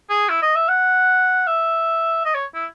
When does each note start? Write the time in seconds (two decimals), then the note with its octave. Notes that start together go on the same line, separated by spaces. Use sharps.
0.10 G#4
0.29 E4
0.43 D#5
0.56 E5
0.69 F#5
1.47 E5
2.25 D#5
2.35 C#5
2.55 E4